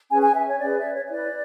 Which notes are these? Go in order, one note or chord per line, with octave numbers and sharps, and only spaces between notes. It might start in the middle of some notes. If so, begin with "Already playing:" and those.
C#4 G#4 B4 G#5
G#5
E5
C#5
C#4 G#4 B4 D5
E5
C#5
C#5
E4 B4 D5